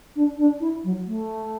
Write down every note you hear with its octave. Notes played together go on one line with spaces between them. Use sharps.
D4
D4
E4
F#3
A3